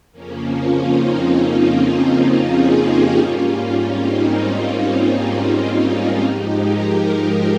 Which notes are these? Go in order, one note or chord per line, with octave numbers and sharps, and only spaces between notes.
F2 C#3 F3 A#3 C#4
C#4 F4
C4 D#4
F4 G#4
D#4 G4
G#2 G3 A#3 C#4 F4
C4 D#4
C4
A#3
C4
A#3 C#4
C#4 F4
G#2 F3 G#3 D#4 G4
G4 A#4